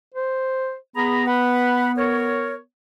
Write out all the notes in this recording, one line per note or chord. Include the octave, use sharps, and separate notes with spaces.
C5
B3 G#4 A#5 B5
B4 F#5 B5
A#4 C#5